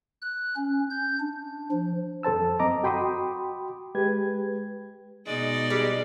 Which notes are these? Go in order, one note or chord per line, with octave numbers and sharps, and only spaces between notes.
F#6
C#4
G6
D4
F3
F2 A4 C5 A5 E6
F#2 C4 D#5 A#5 D6
F#4 G5 B5 C6 D6 D#6
G#3 G4 B4 G#6
B2 G#3 D#4 D5
G3 G#3